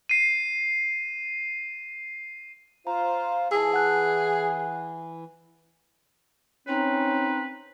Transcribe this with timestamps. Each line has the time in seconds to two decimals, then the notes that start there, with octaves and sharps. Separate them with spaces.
0.09 C7 D#7
2.87 F4 C5 F5 A#5
3.52 E3 G#4 A5 E6
3.73 F#5 F#6
6.67 C4 C#4 D#4 B4